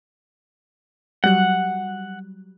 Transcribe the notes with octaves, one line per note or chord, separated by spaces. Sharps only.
F#3 G3 F#5 F#6